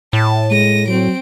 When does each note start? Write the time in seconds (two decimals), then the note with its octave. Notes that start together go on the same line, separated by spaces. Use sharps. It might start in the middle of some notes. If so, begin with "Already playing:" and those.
0.13 A2 A5
0.51 G#3 A#6 D#7
0.88 F#3 C4 D7